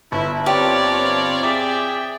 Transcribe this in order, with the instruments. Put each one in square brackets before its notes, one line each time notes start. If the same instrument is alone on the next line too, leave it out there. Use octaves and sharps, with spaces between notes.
[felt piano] G1 [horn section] E4
[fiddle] C4 D5 [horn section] F4 C#5 [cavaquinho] G4
[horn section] G#4 E5 G5 [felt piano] D6 A6 B6